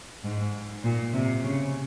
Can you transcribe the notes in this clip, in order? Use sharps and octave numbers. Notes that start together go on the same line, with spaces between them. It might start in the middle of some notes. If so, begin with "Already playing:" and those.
G#2
A#2
C3
C#3